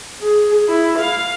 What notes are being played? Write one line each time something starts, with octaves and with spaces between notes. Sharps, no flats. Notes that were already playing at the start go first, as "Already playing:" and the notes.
G#4
E4
F5